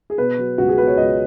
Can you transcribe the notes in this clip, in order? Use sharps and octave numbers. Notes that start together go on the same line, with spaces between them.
G#4
B2 B4
F#3
C#2 F#4
G#4
B2 B4
C#5
C#2 D#5